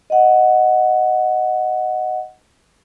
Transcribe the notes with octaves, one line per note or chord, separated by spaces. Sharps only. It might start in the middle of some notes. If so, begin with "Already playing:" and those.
D#5 F#5